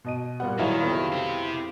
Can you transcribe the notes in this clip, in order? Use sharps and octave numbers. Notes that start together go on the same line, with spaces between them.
B2 D#5 D#7
A#2 G3 B3 F#5
D#3 F#3 G#3 B3 E4 F5
F2 C3 B3 F4
C4 G4